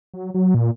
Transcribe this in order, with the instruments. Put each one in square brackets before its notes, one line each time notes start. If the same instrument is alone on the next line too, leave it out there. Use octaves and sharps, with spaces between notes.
[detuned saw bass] F#3
F#3
A#2